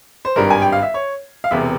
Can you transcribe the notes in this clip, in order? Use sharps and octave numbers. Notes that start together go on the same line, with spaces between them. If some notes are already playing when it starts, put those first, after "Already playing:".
C5
G#1 G2 G3 A#4
G#5
G5
F5
E5
C#5
F5
E1 E2 C3 E5